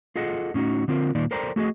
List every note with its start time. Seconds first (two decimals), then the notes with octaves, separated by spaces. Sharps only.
0.16 F4 G#4 A4 D#5 F#5
0.54 A2 C#4 D#4 F#4
0.88 D3 C4 F4 A#4
1.15 A#2 D#3 A#3 D#4 D5
1.31 A4 A#4 C5 D5 G5 A#5
1.56 A3 F#4 G#4 D#5